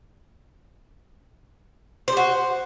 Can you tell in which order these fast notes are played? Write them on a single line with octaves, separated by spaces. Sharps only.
C5 G4 F#4